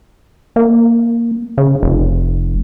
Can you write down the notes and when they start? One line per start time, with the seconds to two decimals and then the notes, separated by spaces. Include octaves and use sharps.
0.56 A#3
1.58 C#3
1.83 F1